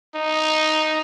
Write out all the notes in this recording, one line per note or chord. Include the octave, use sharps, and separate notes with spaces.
D#4